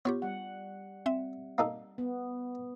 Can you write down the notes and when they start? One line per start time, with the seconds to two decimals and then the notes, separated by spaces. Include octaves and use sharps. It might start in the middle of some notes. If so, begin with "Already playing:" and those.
0.05 B3 F4 G4 C#5
0.22 G3 F#5
1.06 C4 E5
1.58 A#3 D#4 A4
1.98 B3